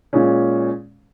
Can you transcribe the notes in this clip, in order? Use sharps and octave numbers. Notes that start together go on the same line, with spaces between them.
A#2 G#3 C#4